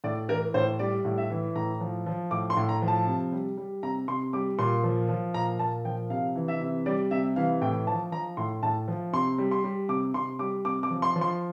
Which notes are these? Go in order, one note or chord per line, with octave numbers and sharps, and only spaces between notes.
A2 D5
E3 A#4
A2 C5
G3 D5
A2
E5
E3
A2 A#5
F3
F3
A2 D6
C6
A2
A#5
F3
A5
C3
G3
G3
C3 A#5
C3 C6
G3 D6
A#2 C6
F3
F3
A#2 A#5
A#2 A5
F3 G5
C3 F5
E3
E5
C3
G3 D5
C3 E5
E3 F5
A2 G5
F3 A5
F3 A#5
A2 C6
A2 A5
F3
C3 C6
G3
C6
G3
C3 D6
C3 C6
G3 D6
C3 D6
D6
F3
C6
F3
C6